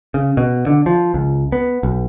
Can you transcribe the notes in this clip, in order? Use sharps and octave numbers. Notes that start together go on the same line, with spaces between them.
C#3
B2
D3
F3
C#2
B3
B1